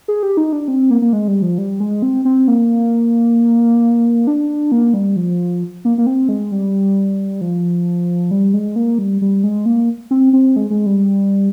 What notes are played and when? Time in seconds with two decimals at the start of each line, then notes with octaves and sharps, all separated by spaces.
0.08 G#4
0.23 G4
0.37 D#4
0.53 D4
0.68 C4
0.90 A#3
1.02 A#3
1.13 G#3
1.28 G3
1.42 F3
1.58 G3
1.80 G#3
2.02 C4
2.25 C4
2.48 A#3
4.27 D4
4.72 A#3
4.94 G3
5.16 F3
5.85 A#3
5.98 A#3
6.06 C4
6.29 G#3
6.52 G3
7.41 F3
8.31 G3
8.53 G#3
8.76 A#3
8.99 G3
9.22 G3
9.44 G#3
9.66 A#3
10.11 C4
10.33 C4
10.56 G#3
10.70 G#3
10.86 G3